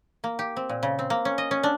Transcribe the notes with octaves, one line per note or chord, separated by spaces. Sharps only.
A#3
G4
C4
A#2
C#3
C4
A#3
C#4
D#5
C#4
D4